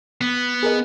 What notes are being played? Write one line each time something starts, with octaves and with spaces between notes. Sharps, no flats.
B3
G#4 A#4 D#5